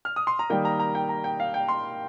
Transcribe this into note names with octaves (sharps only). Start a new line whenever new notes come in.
F6
D#6
C6
A#5
D#3 G3 A#3 G5
A#5
A#5
G5
A#5
G5
F5
G5
C6